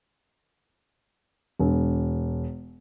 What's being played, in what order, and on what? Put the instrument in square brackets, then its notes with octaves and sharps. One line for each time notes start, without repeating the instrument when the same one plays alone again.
[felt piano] E1